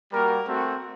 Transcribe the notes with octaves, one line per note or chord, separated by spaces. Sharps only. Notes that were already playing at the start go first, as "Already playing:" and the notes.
G3 A#3 F#4 A#4
A3 C4 F#4